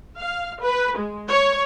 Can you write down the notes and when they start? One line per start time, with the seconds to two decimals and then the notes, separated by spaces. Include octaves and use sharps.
0.18 F5
0.62 B4
0.97 G#3
1.29 C#5